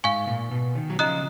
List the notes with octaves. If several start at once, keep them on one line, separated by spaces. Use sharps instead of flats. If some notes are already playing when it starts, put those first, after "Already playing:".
G#2 F5 G#5 C#6
A#2
B2
D#3
F#3
C#3 F3 D#5 A#5 D#6 F#6